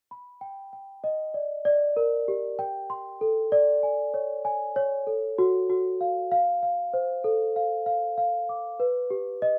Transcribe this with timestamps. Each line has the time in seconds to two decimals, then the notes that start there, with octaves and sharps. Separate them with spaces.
0.11 B5
0.41 G5
0.73 G5
1.04 D#5
1.34 D5
1.65 D5
1.97 A#4
2.28 G4
2.59 G5
2.90 C6
3.21 A4
3.52 D5
3.83 G#5
4.14 C#5
4.45 G#5
4.76 C#5
5.07 A4
5.38 F#4
5.69 F#4
6.01 F5
6.32 F5
6.63 F5
6.94 C5
7.24 A4
7.56 F5
7.86 F5
8.18 F5
8.49 D6
8.80 B4
9.10 G4
9.42 D#5